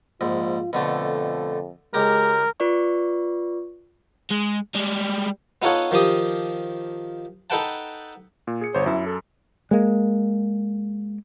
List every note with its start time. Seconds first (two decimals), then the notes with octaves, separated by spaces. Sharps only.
0.21 A#1 G#2 F4
0.73 F2 B2 D3 A3
1.94 C#2 G#3 G4 A#4 A#5
2.60 F4 B4 D5 C#6
4.31 G#3
4.75 G3 G#3
5.62 B3 D#4 F4 A4 C#5 F#5
5.91 D#3 F3 G4 D#6
7.50 D#4 A4 B4 F#5 G5 A5
8.47 A#2
8.61 G#4 C#7
8.74 G1 C5 C#5
8.86 F#2 E4
9.06 A4
9.71 G#3 A#3